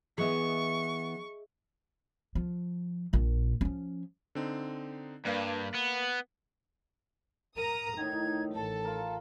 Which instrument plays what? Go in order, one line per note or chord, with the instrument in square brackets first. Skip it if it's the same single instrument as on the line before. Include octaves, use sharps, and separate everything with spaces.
[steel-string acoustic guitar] E3 B3 [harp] G#4 D#5 E5 [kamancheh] C#6
[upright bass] F3
A#1 A#2
F3 C#4
[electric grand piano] D3 C4 D#4
[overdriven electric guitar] G2 [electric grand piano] A#3 B4 F5
[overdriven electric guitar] B3
[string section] A#4 A#5 D#6 [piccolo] D#7
[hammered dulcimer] A2 D3 D#3 [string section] D#4 [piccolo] G#6
[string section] A1 A4 [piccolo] A5
[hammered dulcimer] F4 A#4